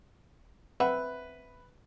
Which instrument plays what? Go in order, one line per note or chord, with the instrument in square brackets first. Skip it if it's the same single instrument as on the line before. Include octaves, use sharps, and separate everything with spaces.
[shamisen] C4 E5 F#5 [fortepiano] B4